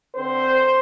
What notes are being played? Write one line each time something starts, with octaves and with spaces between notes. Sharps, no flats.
D3 C4 C5